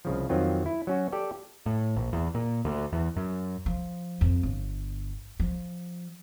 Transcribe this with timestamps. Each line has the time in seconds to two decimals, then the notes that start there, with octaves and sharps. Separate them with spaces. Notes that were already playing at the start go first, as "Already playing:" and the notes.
0.05 C2 C#3 F3
0.29 F2 D#3 F#3 C4 F4
0.66 E4
0.87 F#3 C#4 F#4
1.12 G4 A4 D5 G5
1.66 A2
1.96 A#1
2.13 E2
2.35 A#2
2.65 D2
2.93 E2
3.16 F#2
3.66 F3
4.21 F2
4.43 G1
5.40 F3